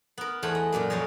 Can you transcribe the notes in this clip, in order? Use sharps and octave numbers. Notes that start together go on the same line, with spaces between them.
B3 A#4
E2 A3 C5 F#5 G#5 B5
D#5
F#2 A#2 F#3 A#3
F2 C4 F4 G#4 C#5 D#5